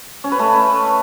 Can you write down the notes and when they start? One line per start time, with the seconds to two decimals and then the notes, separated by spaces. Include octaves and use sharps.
0.24 C#4
0.32 B4
0.39 A3